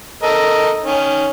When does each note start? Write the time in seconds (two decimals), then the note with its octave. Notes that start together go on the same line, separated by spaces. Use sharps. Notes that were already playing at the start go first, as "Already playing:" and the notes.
0.23 A4 A#4 D#5
0.85 D#3 C#4